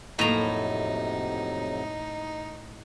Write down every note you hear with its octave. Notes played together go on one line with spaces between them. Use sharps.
F2 A2 C3 F#3 A#3 B3 D#4 A#5